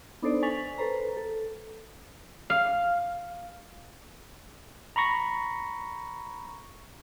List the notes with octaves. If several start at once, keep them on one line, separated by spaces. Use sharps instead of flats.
B3 D4 D#4 A4 C5 D5
G#5 C#6 A6 B6 F7 F#7
A4 B4 C5 A#5
A4
F5
A#5 B5 C#6 A#6